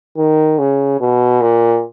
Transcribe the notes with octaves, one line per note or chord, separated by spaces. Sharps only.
D#3
C#3
B2
A#2